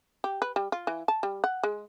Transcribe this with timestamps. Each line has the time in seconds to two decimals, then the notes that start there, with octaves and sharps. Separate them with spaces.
0.24 G4
0.42 B4
0.56 G3
0.72 F4
0.87 E3
1.08 A5
1.23 G3
1.44 F#5
1.63 G#3